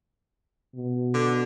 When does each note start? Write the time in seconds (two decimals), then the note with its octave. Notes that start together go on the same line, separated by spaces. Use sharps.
0.75 B2
1.14 D3